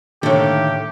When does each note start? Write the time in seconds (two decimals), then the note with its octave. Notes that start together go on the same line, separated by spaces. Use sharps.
0.23 A2 D3 D#3 A#3 G4 A4